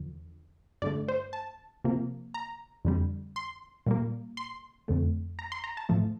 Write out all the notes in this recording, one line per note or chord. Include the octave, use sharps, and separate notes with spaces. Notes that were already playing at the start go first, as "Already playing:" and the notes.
Already playing: E2 D3 F3
G2 D3 A3 D5
C5
A5
C3 F3 A#3
A#5
F2 D3 G3
C6
A#2 G3 A#3
C6
F2 D3 A3
A#5
C6
A#5
A5
A2 F3 A3